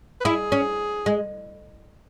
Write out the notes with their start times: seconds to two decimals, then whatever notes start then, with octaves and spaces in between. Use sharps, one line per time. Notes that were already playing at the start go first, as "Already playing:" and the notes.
0.20 B4
0.25 E4 G#4
0.52 C#4
1.06 G#3